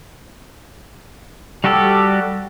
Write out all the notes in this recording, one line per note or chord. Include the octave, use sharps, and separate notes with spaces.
G3 F#4 G4 A4